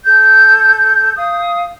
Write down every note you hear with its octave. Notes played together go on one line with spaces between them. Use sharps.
A4 G6
F5 D#6